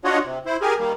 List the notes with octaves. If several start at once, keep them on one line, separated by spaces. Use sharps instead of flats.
D4 F4 F#4 C#5 D#5 F#5
C3
E4 C5
G4 G#4 A#4 G#5
D#3 G3 A#3